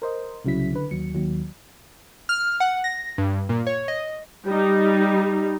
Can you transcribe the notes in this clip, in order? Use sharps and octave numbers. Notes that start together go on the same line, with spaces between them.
A#4 C5 D#5
C2 C#3 F#3 E4 B6
D3 B4
D#2 F#3 C#7
D#2 F#3
F6
F#5
A#6
G2
A#2
C#5
D#5
G3 D#4